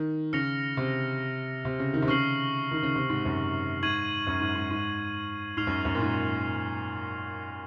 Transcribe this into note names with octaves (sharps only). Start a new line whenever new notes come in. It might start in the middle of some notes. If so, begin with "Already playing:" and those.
Already playing: D#3
C#3 F6 A#6 C#7 F7
C3
C3
C#3
D#3
C3
C#3 C#6 F6 C7 F#7
D#3
C#3
C3
G#2
F#2
G#2 C#6 G#6 D#7 F#7
F#2
G#2
G#2
G#2
G#2 F6 C7 F7
F#2
F#2
A#2
G#2